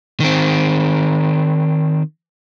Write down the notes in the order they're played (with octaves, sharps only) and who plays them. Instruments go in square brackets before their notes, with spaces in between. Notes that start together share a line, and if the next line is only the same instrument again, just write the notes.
[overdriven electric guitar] D#3 C4